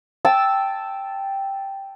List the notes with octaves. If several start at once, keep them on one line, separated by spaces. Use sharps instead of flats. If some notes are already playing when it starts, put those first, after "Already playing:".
G5 A5 E6